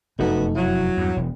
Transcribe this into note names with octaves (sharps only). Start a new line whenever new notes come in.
F1 F#2 A3 B3 D#4 F#4 A4
F#3 E4
E2 G2
E1